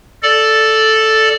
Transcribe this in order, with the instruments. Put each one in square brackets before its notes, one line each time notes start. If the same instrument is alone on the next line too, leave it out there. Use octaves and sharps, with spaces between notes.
[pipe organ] A4 D5